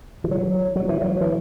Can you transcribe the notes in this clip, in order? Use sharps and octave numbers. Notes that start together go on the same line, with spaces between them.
E3
F#3
F#3
E3
F#3
E3